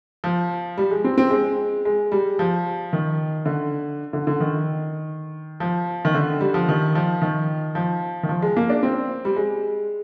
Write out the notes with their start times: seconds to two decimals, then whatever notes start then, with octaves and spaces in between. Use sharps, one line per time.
0.24 F3
0.78 G3
0.91 G#3
1.04 C4
1.18 C4
1.31 G#3
1.85 G#3
2.12 G3
2.39 F3
2.93 D#3
3.46 D3
4.13 D3
4.27 D3
4.40 D#3
5.60 F3
6.05 D#3
6.15 D3
6.41 G3
6.54 F3
6.69 D#3
6.95 F3
7.22 D#3
7.75 F3
8.23 D#3
8.29 F3
8.42 G#3
8.57 A#3
8.70 D4
8.83 C4
9.25 G3
9.36 G#3